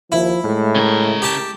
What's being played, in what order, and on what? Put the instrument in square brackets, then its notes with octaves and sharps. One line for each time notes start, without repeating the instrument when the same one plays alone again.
[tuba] D#2 [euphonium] F3 [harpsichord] E4
[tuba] A2 [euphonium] G#3
[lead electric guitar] C#3 A#4
[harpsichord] G4 A5